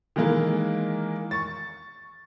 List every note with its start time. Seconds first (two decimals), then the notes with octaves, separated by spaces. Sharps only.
0.16 D#3 E3 G#3 A#3
1.31 C#6 A6